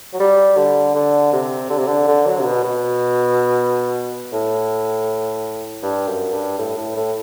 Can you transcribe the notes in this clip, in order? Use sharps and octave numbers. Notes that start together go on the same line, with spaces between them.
F#3
G3
D3
D3
C3
D3
C3
D3
D3
F#3
C3
B2
B2
A2
G2
F#2
G2
A2
A2
A2